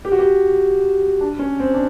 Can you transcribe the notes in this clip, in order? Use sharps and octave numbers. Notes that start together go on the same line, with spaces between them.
G4
F#4
G4
D4
C#4
C4
D4